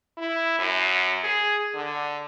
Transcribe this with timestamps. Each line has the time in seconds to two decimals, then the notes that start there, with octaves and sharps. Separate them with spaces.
0.18 E4
0.59 F#2
1.24 G#4
1.74 D3